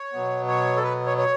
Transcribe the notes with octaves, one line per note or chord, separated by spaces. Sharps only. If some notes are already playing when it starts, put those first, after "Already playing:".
Already playing: C#5
B2 F#3 B3
C#5
A4
B4
C#5
C#5